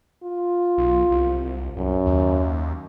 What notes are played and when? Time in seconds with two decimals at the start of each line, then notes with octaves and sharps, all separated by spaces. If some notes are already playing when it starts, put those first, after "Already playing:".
0.23 F4
0.78 B1
1.11 C2
1.76 C2 F#2
2.06 D#2